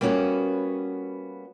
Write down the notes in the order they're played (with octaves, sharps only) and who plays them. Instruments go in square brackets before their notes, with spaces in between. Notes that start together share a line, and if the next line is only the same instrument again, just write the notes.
[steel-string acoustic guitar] G3 A#3 B3 C#4 F#4